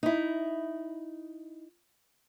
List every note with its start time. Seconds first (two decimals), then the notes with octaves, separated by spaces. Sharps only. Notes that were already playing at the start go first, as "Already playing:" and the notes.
0.03 D#4 E4